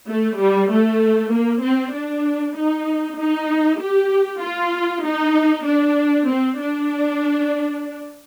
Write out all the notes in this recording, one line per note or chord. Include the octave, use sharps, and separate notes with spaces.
A3
G3
A3
A#3
C4
D4
D#4
D#4
G4
F4
D#4
D4
C4
D4